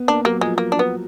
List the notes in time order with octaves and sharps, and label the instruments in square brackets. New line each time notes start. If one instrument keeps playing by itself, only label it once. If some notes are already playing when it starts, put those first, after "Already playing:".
Already playing: [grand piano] B3
[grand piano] A#3 [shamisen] D4
[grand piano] F#3 [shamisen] A#3
[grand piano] F3 [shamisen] G#3
[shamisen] A#3
D4
B3